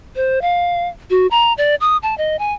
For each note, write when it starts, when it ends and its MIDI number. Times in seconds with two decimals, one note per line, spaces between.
0.16 0.39 72
0.42 0.88 77
1.10 1.27 66
1.31 1.53 82
1.58 1.75 74
1.80 1.97 87
2.03 2.17 81
2.18 2.36 75
2.39 2.53 80